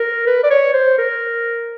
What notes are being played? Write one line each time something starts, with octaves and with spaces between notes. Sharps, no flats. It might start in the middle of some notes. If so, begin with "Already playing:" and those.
Already playing: A#4
B4
D5
C#5
C5
A#4